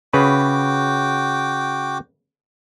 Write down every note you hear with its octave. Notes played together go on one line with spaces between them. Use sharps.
C#3 F#4 B4 G5 D6